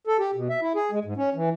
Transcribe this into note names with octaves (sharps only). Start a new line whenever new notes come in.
A4
G4
B2
E5
E4
G#4
G#3
G#2
C#4
E3